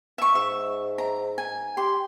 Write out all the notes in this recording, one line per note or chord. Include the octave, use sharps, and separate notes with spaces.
E5 C#6
G#2 E5
A#5
G#5
G4 C6